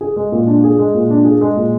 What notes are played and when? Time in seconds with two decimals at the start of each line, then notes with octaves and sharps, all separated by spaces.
0.01 G#4
0.16 G#3
0.32 A#2
0.47 D4
0.64 G#4
0.79 G#3
0.94 A#2
1.10 D4
1.25 G#4
1.41 G#3
1.57 A#2